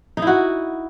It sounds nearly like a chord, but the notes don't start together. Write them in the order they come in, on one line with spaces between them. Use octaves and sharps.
D#4 E4 F#4